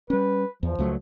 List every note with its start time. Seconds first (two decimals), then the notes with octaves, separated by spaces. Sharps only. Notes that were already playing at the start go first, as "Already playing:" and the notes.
0.10 G3 C#4 B4
0.63 E2 F3
0.79 C#2 F#3 A3